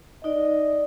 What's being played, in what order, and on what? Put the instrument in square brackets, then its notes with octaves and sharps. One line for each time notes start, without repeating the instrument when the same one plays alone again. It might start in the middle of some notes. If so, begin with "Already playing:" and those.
[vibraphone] D#4 D5 [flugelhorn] D#5